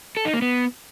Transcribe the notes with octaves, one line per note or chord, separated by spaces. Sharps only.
A4
D#4
A#3
B3